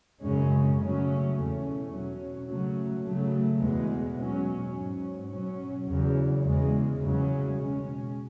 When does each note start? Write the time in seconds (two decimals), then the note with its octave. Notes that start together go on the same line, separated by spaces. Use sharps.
0.21 F#2 C#3 G#3 C#4
0.78 C#3 F#3 A3 C#4
1.35 E2 B2 A3 C#4
1.91 B2 F#3 C#4
2.48 C#3 F#3 A3 C#4
3.04 C#3 F#3 A3
3.61 E2 B2 G#3 B3
4.17 B2 F#3 C#4
4.74 G#2 F#3 C#4
5.30 B2 F#3 C#4
5.86 E2 C#3 F#3
6.43 E2 C#3 G#3
7.00 E2 C#3 F#3 C#4
7.56 B2 G#3 C#4